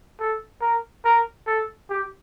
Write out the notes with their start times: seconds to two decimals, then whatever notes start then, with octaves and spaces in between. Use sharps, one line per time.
0.20 A4
0.61 A#4
1.05 A#4
1.47 A4
1.90 G4